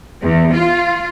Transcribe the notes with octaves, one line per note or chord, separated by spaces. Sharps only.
E2
F4